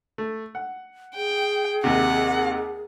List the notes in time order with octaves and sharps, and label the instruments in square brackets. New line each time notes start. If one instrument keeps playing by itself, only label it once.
[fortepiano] A3
F#5
[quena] G#4 [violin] G5
[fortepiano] D#2 C3 [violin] F#5